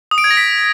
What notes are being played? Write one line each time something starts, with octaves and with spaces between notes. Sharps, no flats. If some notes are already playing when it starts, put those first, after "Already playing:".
D#6
D7
G#6
A#6
B6